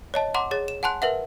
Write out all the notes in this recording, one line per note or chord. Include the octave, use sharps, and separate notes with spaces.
C#5 D#5 A5
F#5 A#5 C6 D6
G#4 C#5 A6
E7
F#5 G#5 A5 C6 F#6
A#4 B4 E5 F#5